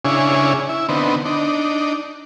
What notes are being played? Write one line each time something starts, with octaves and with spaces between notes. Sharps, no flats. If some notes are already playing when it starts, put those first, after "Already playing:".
C#3 C#4 D4 E4 G#4
E4
D3 B3 C4 D#4
D4 D#4